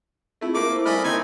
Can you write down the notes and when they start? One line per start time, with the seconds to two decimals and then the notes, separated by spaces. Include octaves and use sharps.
0.41 A3 C4 E4 F4 G#4
0.55 A3 A#3 D6
0.70 E4 C5 E6
0.85 G3 A3 E4 D5 D#5 G#5 B5 F6
1.04 D#3 A#3 C4 D#4 G#5